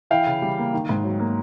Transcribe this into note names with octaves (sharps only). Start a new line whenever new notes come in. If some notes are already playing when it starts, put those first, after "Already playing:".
E3 F5 G5
C#3
G3
A#3
D#3
G#2
F#3
A#3